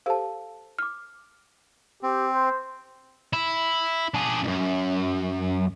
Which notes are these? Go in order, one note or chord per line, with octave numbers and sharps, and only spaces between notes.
G4 A4 C5 F5 A5
D6 F6
C4 G4
C5
E4
D4 G#4
C#2 F#2